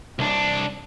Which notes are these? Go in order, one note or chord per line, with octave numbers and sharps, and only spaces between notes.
C2 D4